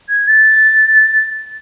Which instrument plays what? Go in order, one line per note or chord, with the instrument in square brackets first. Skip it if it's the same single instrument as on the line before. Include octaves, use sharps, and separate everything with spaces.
[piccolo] G#6
A6